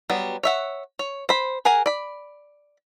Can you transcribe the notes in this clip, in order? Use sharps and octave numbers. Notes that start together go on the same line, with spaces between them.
F#3 G3 B3
C#5 E5 F#5
C#5
C5 B5
G#4 A#4 F#5 G#5
D5 B5